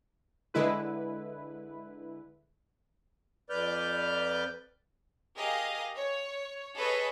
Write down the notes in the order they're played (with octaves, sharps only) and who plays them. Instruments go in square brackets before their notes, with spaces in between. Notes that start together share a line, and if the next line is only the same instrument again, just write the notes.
[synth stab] D3 G#3 E4 B4
[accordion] F2 B4 D5 F6 G6
[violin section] G4 G#4 A#4 D#5 F5
C#5
G#4 A4 B4 C#5 D#5